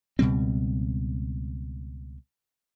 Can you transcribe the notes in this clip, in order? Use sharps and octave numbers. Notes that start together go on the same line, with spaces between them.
C#2 B2 G3 C4